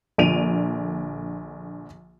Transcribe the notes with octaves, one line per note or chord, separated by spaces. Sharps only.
A#1 D3 D7 D#7 F7